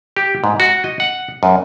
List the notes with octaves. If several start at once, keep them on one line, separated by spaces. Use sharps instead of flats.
G4
G#2
F#4
D#5
F#5
F#2